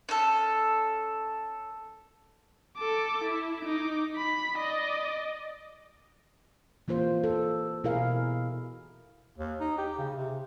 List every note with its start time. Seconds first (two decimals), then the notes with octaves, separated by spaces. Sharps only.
0.09 C#4 A4
2.77 A4 D6
3.24 E4
3.63 D#4 D6
4.16 B5
4.57 D5 D#5
6.88 E3 A#3 F4 C5
7.24 A4
7.84 B2 E4 G#4 A#4 F5
9.38 D#2
9.60 D#4
9.78 G4
9.98 C#3
10.16 C3